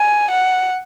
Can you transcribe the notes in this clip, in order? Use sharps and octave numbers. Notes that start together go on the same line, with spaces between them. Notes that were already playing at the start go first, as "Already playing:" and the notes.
Already playing: G#5
F#5